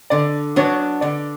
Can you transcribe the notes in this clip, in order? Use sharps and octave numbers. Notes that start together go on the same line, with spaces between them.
D3 D5
F#3 B3 D4 C#5
D3 D5